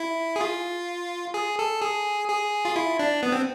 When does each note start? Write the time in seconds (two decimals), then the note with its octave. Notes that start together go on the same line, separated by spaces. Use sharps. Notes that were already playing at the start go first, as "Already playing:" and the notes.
Already playing: E4
0.36 G#4
0.41 F4
1.34 G#4
1.59 A4
1.82 G#4
2.29 G#4
2.65 F4
2.76 E4
2.99 D4
3.23 B3
3.32 C4